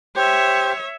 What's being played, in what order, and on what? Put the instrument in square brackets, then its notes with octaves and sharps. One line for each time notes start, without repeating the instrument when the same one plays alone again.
[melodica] G4 C5 [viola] C#5 E5